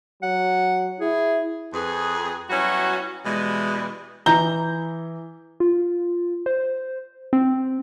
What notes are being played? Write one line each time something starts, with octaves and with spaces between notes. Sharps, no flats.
F#3 F#5
E4 G#4
F2 G#4 B4
F#3 G3 B3 C#4 E4 F#4
B2 E3 G3 G#3
E3 A#5 G6 G7
F4
C5
C4